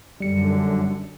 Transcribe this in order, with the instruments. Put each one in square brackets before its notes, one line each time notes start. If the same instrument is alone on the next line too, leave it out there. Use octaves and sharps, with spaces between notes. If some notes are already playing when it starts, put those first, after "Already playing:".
[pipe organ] F#2 D3 [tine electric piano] G3 C#7